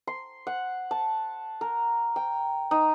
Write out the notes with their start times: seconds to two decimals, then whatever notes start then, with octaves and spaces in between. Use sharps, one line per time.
0.07 C6
0.47 F#5
0.91 A5
1.61 A#4
2.16 G5
2.71 D#4